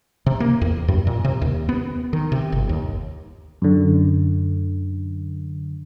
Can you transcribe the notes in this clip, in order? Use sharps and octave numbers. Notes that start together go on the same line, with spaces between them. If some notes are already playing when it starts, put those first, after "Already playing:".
C3
A#3
E2
F#2
A#2
C3
D#2
B3
D#3
C3
G1
D#2
F#2 D3